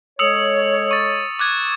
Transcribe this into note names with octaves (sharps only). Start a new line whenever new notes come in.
G#3 A4 C#5 D#6 E6 C#7
C#6 A6
D6 F#6 G#6